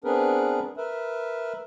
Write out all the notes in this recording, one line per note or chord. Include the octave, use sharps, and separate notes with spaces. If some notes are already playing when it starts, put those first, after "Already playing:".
B3 C4 D4 G#4 A#4 B4
A#4 B4 E5